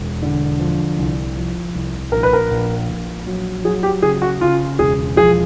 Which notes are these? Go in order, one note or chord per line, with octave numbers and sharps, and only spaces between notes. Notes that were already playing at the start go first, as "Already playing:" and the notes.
Already playing: E1
D3
F3
C2
F3
C2
A#1 A#4
B4
A#4
A#1
A#1
F#3
F#3 G#4
G4
C#3 G#4
F#4
C#3 F4
E1 G#4
F3 G#4